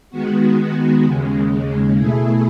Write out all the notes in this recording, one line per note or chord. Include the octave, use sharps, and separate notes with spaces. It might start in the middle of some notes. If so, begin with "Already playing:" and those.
D#3 G#3 B3 F#4
D#2 C#3 G#3
B2 A3 E4 G#4